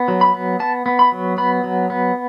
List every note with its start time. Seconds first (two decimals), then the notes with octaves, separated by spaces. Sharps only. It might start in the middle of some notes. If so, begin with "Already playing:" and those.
Already playing: B3
0.08 F#3
0.21 B5
0.34 B3
0.60 B3 A5
0.86 B3
0.99 B5
1.12 F#3
1.38 B3 B5
1.64 F#3
1.90 B3